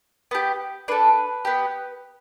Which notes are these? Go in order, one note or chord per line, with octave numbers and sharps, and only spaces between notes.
B3 G4
D4 A4 B4
B3 G4